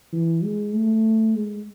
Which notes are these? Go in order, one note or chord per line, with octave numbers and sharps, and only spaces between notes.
E3
G#3
A3
G#3